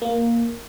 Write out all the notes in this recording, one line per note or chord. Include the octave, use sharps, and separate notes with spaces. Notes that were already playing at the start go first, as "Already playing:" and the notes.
A#3